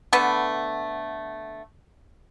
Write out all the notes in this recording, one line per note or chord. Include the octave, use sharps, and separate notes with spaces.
D3 A3 B3 B4